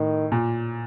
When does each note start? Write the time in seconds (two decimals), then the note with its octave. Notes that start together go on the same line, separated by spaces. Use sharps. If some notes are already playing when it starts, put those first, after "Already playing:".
Already playing: A2 D#3
0.32 A#2